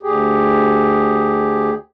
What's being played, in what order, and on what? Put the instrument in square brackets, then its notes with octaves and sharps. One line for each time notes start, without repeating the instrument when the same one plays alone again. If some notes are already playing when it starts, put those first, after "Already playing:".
[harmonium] D2 G4 G#4